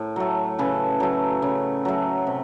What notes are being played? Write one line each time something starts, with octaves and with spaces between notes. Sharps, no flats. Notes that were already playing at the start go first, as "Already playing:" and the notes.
Already playing: A2 A#4 C5
F#3 A3
C#3 A4 B4
F#3 A3
C#3
F#3 A3
C3